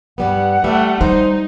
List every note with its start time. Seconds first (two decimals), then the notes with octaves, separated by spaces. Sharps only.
0.18 G2 G3 B3 F#5
0.64 G3 A3 E5
1.01 G3 D#4 C5